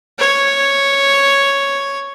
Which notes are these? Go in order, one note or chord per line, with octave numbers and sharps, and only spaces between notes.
C#5